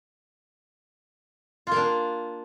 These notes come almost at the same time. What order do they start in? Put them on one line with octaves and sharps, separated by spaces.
F4 A#3 D4